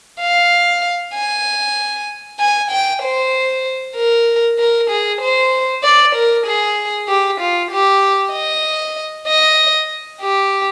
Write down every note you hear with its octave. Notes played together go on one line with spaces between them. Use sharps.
F5
G#5
G#5
G5
C5
A#4
A#4
G#4
C5
D5
A#4
G#4
G4
F4
G4
D#5
D#5
G4